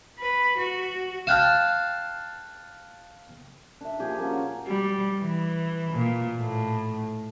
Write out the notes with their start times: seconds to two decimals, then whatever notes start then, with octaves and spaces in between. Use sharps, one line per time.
0.19 B4
0.57 F#4
1.27 F5 G5 A5 F6 F#6 E7
3.81 D4 E5
3.99 A#2 F3 G4 G#4
4.19 A#3 C#4 F#4
4.68 G3
5.21 E3
5.92 A#2
6.39 A2